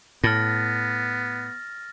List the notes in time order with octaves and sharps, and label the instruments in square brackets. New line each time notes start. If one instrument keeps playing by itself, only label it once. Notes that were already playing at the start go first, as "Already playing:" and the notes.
[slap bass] A2 [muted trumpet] B3 [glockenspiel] F6 A6 A#6